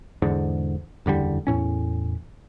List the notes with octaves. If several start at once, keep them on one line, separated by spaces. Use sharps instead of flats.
E2 G#2 D3
F#1 E2 D3 G3
E2 A2 C#4